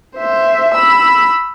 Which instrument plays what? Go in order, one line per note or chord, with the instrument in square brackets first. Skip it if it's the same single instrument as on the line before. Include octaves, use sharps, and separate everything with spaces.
[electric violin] C5 E5
B5 E6